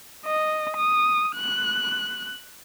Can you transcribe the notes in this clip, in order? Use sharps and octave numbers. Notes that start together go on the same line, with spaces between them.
D#5
D#6
F#6